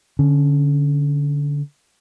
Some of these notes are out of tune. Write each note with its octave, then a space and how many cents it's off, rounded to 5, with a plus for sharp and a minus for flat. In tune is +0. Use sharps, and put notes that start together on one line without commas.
D3 -15 C#4 +0